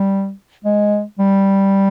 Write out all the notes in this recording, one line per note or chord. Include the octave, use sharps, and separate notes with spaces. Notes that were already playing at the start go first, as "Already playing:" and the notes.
Already playing: G3
G#3
G3